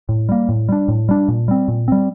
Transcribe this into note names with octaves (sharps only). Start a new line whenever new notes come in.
A2
G3 A#3
A2
G3 D4
A2
G3 D4
A#2
G3 C4
A#2
G3 C4